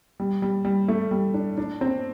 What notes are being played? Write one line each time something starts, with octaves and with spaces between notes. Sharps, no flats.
G3
G3
G3
A3
G3
D4
D4
C4